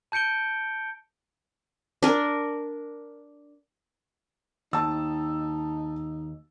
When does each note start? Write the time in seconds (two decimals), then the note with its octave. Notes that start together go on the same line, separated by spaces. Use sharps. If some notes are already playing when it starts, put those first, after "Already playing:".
0.12 A5 G6 C#7 D7 G7
2.03 D4 A#4
4.73 D#2 D#4 A5 E6